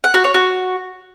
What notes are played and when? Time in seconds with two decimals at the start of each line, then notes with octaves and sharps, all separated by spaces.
0.04 F#5
0.14 F#4
0.24 C#5
0.34 F#4